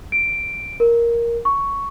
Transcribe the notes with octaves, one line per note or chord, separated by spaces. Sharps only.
D7
A#4
C#6